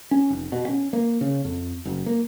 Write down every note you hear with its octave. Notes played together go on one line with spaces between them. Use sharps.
C#4
F1
B2
C#4
A#3
C#3
F2
F#1
A#3